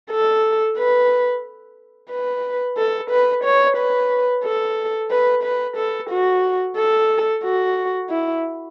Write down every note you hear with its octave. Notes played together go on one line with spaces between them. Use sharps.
A4
B4
B4
A4
B4
C#5
B4
A4
B4
B4
A4
F#4
A4
F#4
E4